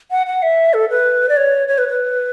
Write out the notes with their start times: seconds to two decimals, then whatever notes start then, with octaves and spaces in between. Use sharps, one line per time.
0.11 F#5
0.27 F#5
0.43 E5
0.74 A4
0.90 B4
1.29 D5
1.37 C#5
1.68 C#5
1.78 B4
1.89 B4